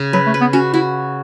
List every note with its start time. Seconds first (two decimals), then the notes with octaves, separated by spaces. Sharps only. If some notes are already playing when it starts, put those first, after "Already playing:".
Already playing: C#3
0.13 F#3 B4
0.27 A3
0.34 B4
0.41 B3
0.53 C#4 F#4
0.74 E4 F#4